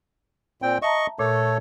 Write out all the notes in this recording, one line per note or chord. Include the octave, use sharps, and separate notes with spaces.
A#2 C4 G5
D#5 E5 A5 A#5 C#6
A#2 A3 A4 C#5